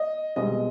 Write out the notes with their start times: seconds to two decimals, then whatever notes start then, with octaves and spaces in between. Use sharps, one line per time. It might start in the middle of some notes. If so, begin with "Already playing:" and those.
Already playing: D#5
0.36 C2 B2 G#3 D#5